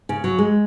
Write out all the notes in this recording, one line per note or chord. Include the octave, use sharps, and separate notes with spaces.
C#3
F#3
G#3